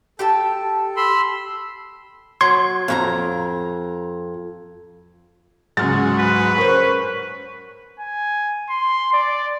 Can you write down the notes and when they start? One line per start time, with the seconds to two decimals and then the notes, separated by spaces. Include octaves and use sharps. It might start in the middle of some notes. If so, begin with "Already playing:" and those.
0.19 G4 A4 G5 A5
0.97 B5 C6 E6
2.41 F#3 C6 G#6
2.88 F2 F#4 A#5
5.77 C#2 G#2 F#3 F6 A6
6.19 B4
6.58 C#4 A#4 C5
8.00 G#5
8.70 C6
9.13 D5